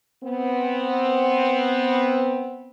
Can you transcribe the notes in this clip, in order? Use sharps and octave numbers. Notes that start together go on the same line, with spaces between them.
B3 C4